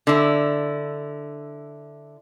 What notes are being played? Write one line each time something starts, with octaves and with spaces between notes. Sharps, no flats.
D3 E4